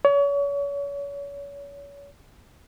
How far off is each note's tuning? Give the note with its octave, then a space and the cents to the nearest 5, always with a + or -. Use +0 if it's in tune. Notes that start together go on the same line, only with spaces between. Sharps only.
C#5 +35